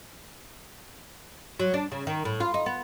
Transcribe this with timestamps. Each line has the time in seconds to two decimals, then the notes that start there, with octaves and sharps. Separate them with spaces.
1.60 F#3
1.74 D4
1.92 C#3
2.07 D#3
2.25 A2
2.40 F4
2.54 D#4
2.66 B3